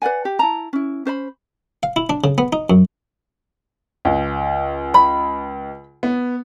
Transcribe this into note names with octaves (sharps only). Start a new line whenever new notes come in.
B4 D5 F#5 G#5
G4
E4 A5 A#5
C#4 E4
C#4 C5 C#5 B5
F5
E4
D4
C#3
B3
D#4
F#2
C#2
B5
B3